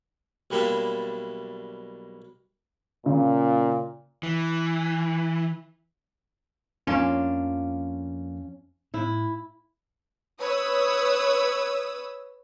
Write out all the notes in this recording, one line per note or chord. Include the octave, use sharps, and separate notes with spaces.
B1 G3 A#3 D4 E4
A#2 C#3
E3
F2 F3 A#3 C#4 D4 F4
A2 E4
B4 C#5 D#6 E6